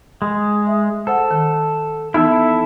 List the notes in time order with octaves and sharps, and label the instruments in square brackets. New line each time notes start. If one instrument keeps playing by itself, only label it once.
[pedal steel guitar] G#3
[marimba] E5
[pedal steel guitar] A4 [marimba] C5 F#5
[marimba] D#3
[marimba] E3 B3 D#4 [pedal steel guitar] E4 A4 E5